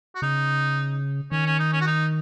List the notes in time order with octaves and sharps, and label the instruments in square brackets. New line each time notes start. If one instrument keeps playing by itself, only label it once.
[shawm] F#4
[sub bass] C#3 [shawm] D#4
[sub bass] D#3 [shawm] C#4
[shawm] C#4
D#4
C#4
F#4
D#4